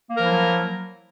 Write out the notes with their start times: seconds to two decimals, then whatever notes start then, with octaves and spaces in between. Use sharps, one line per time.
0.10 A#3
0.15 A#4
0.20 F3
0.25 E4
0.29 F#3